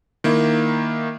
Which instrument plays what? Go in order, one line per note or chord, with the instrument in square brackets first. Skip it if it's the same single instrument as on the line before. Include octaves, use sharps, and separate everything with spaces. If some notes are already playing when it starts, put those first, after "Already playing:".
[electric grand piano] D#3 A#3 E4